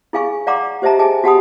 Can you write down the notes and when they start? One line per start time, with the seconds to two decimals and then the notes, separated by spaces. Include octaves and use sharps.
0.13 E4 G#4 F5 G#5 C#6
0.47 D5 F5 F#5 A#5 C6 D6
0.82 G4 C5 D#5 E5 A5 A#5
0.99 G#4 D#5 G#5 A5
1.24 F#4 G4 F#5 A5 B5 D#6